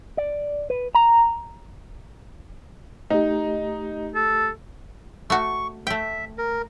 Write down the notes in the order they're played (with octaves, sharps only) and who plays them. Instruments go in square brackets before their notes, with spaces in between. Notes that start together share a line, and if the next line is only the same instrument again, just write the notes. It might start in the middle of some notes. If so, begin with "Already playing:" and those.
[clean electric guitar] D5
B4
A#5
[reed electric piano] A3 G4 [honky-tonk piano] D#4
[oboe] A4
[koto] A3 F#4 [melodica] C#6
[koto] A3 G5 [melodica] E5
[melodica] A#4